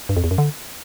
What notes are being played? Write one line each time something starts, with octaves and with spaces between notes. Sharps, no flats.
G2
F2
E2
F#2
D3